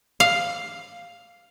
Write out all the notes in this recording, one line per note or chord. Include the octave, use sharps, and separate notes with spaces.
F5